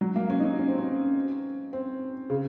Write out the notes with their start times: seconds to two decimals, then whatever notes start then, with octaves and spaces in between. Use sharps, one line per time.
0.01 F#3
0.16 A#3
0.30 C#4
0.40 D#4
0.44 C#4
0.59 C#4
0.68 C4
0.78 C#4
1.73 C4
2.30 C#3